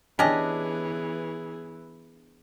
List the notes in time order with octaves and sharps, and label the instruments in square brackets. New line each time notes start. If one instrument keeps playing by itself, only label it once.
[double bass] E3 [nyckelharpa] B3 G#4 [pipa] C#4 G4 D#5 [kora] D4